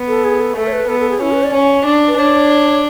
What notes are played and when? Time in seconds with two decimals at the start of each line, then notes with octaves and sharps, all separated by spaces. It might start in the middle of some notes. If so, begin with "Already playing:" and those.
Already playing: B3
0.08 A4
0.24 G#4
0.41 A4
0.57 A3 A4
0.67 C#5
0.72 B4
0.89 B3 A4
1.00 A4
1.10 G#4
1.21 C#4 E4
1.32 B4
1.43 D5
1.54 C#4
1.87 D4
2.08 B4
2.18 D4 C#5